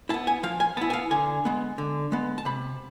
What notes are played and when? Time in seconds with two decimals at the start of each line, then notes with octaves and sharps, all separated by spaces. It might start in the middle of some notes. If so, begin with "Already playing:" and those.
0.09 E4 A5
0.14 B3
0.27 G#5
0.43 F3 F5
0.60 G#5
0.77 B3 A5
0.81 E4
0.90 G#5
0.93 F5
1.11 D3 G#5
1.45 G#3 B3
1.78 D3
2.12 G#3 B3
2.38 A5
2.45 C3 B5